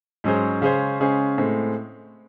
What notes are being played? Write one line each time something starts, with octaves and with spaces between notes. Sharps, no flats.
G#2 F#3 C#4 G#4 C5
C#3 G#3 C#4 G#4 C5
C#3 G#3 C#4 G#4 C5
A2 G#3 C4